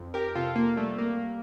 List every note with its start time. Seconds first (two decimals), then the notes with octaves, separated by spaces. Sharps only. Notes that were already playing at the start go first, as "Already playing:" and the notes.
Already playing: F2
0.14 G4 A#4
0.35 C3 F4 A4
0.56 A#3
0.76 G3 A3
0.98 A#3